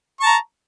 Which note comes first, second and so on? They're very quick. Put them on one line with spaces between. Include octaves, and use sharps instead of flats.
C#6 A5 A#5